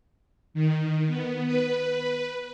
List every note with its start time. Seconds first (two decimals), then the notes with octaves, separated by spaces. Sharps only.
0.54 D#3
1.07 B3
1.46 B4